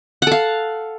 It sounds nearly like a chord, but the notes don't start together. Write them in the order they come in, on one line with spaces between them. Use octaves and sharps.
F#5 A4 F5